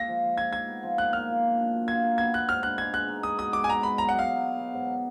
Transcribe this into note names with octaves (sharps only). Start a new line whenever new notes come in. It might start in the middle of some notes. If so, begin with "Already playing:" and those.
Already playing: G#3 A#3 F4 A#6
F3
F3
D#4 G#6
D#4 G#6
B3
F3
A#2 F#6
A#2 F6
A#2
A#2
D4
F#3
F4 G#6
A#4
B3 G#6
B3 F#6
G#2 F6
D4 F#6
G#3 G#6
G#3 F#6
D#4
G#3 D#6
B2 D#6
G#3 D6
G#5
G#3 A#5
G#3 B5
F#3 A#5
F#3 F#5
F5
F#3
F#3
B3
G#2